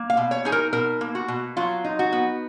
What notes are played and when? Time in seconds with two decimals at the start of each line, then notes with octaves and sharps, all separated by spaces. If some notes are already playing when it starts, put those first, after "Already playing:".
Already playing: A#3
0.10 F5
0.17 B2
0.31 C#5
0.45 D#4 G#4
0.52 A#4
0.73 B2 A#4
1.01 A#3
1.15 F#4
1.28 B2
1.57 F#3 F4
1.84 D#4
1.99 F#4
2.12 B3